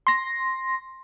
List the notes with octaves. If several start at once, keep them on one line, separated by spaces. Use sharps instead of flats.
C6 A#6